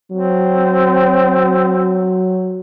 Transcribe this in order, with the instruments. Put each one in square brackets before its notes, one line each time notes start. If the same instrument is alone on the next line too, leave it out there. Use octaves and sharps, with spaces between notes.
[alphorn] F#3 [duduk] C4